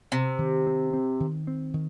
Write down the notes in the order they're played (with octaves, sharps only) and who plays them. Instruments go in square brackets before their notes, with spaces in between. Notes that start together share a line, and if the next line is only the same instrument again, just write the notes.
[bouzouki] C3 [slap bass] C4
[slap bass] D#3
C4
C4
D#3
C4
D#3